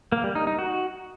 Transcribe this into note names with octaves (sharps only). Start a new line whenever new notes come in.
A#3
G3
D#4
D#4
F#4